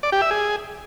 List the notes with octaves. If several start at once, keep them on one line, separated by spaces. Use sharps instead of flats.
D5
G4
E5
G#4